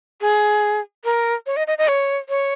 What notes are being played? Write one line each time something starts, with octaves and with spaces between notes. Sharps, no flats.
G#4
A#4
C#5
D#5
D#5
D#5
C#5
C#5